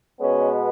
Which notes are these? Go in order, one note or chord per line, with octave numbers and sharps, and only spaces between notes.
B2 G#3 B3 C#4